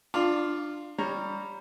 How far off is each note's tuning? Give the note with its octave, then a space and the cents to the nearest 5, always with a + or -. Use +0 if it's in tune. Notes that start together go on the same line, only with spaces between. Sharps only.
D4 +20 F4 +0 D6 -40
G3 +15 C#5 +0 A#5 +0